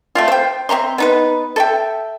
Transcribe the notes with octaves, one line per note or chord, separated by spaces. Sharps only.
A3 C4 F4
C5 G5
C4 E5 A#5 C6
B3 D#4 B4
A4 E5 G5